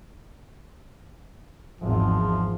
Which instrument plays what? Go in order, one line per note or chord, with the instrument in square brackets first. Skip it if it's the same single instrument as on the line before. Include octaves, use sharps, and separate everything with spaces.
[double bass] G#1 E2 [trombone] F3